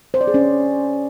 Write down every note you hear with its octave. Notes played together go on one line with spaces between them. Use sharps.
C5
D5
G#4
C#4